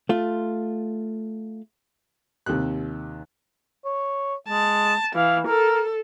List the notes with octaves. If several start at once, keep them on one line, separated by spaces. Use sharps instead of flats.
A3 F4
D#2 C3 G4 F#6
C#5
G#3 A5
E3 F5
A4 A#4